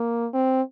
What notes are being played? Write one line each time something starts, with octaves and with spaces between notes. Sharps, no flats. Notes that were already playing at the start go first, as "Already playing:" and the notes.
Already playing: A#3
C4